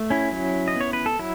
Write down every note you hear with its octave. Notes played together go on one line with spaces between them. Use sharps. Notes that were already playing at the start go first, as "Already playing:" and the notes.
Already playing: A3
C#4 E4
F#3
D#5
B3 C#5
B4
A4
F#3 E4